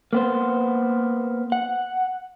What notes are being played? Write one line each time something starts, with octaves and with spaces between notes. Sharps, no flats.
A#3 B3 C5
F#5